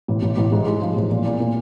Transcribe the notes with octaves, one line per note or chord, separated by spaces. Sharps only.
A1
A1
A1
G#2
G#3
F3
A1
A#2
A#2
A#2